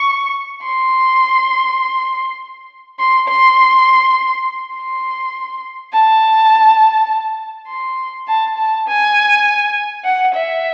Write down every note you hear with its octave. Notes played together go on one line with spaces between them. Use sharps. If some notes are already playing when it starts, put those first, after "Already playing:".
Already playing: C#6
C6
C6
C6
C6
A5
C6
A5
A5
G#5
F#5
E5